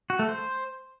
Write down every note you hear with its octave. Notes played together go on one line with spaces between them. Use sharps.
F#4
A3
C5